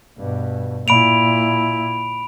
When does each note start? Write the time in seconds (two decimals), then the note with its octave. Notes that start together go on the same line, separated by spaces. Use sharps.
0.18 G2 B2
0.88 A#2 E4 B5 D7 F7